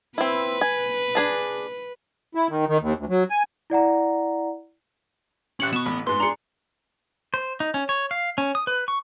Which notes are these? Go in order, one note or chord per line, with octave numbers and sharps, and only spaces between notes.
C4 E4 B4
G#5
D4 G#4 A5
E4
D#3
D#3
D#2
D2
F#3
G#5
E4 D5 F#5 A#5
C#4 G4 F#6 C#7 F#7
B2 B3 C#6 E7
A1 B5
G#2 B3 C6
D4 G#4 A#5 C#7
C5
D#4
C#4
C#5
F5
C#4
D#6
B4
C#6